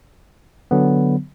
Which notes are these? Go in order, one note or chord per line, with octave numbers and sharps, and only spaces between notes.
D3 F#3 B3